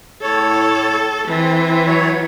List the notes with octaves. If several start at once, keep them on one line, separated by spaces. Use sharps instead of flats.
A2 A4 C#5
E3 C4
F#3 C#5